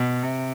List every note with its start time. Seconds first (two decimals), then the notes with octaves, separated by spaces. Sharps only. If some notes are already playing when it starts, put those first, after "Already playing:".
Already playing: B2
0.23 C3